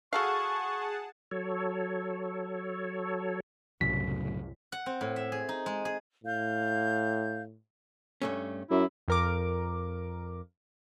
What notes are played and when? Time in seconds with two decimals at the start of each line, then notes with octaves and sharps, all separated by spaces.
0.13 F#4 G#4 A4 F5 F#5 A5 C#6
1.31 F#3 A4 C#5
3.81 C2 F#2 A2 C#3 F#3 B6
4.72 F#5
4.86 C4
5.01 A2
5.16 E5
5.32 G#4
5.49 D#4
5.66 G#3
5.85 G#4
6.24 A2 F5 G6
8.22 G2 A3 C#4
8.71 F#2 E4
9.08 F2 A#4 D6